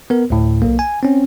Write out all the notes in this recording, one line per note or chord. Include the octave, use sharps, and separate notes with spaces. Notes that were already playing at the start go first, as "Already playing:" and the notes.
B3 A#4
D2 A2
B1 A#3
G#5
C4 C#4